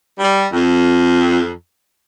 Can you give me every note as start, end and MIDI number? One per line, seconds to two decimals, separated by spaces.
0.20 0.45 55
0.52 1.49 41